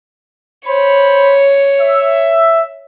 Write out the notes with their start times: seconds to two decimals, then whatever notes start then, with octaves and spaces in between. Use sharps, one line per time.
0.66 C5 C#5 B5
1.80 E5